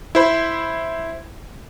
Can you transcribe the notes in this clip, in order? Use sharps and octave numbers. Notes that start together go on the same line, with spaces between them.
E4 C5 B5